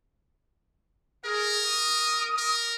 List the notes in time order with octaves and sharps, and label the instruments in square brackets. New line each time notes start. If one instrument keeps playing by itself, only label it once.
[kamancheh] G#4 [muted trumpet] A#4
[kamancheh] D#6
[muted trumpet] A#4